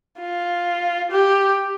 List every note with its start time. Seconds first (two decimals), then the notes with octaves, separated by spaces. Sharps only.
0.20 F4
1.11 G4